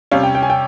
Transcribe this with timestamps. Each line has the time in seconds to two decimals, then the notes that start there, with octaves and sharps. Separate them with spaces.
0.12 C3 G3 C#4 F5
0.23 G5
0.35 G5
0.43 G#5
0.50 G5